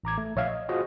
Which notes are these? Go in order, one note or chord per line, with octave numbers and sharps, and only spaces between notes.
A1 A#5 D6 G#6
A3
A#1 C#5 E5 F5 G#6
D#5
F4 F#4 G#4 C5 D#5